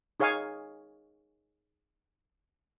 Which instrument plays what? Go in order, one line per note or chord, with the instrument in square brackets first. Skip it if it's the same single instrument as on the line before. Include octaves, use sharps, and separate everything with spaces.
[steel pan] D#4 G#4 C#5 F5 G#5